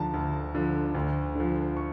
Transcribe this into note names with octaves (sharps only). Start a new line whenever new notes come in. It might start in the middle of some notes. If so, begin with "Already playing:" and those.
Already playing: D2 D3 F3 A5 A#5
D2
D3 F3
D2
D3 F3
C#6